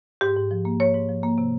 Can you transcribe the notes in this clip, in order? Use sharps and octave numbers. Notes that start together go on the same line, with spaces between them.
G#2 G4
G#2
F3
A#3
G#2 C#5
G#2
F3
A#3
C3